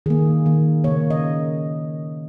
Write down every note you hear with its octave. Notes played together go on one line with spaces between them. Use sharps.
D#3 A#3 G#4
D#3 A#3
C#3 A#3 C#5
D#5